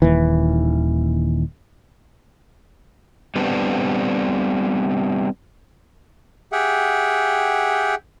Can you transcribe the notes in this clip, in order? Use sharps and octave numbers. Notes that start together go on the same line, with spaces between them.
D#1 D#2 E3
G3 B3 C4 D4
G4 G#4 E5 F#5 G5